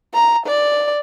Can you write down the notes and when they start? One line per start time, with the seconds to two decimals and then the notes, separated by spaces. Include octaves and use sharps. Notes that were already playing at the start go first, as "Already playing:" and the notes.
0.15 A#5
0.46 D5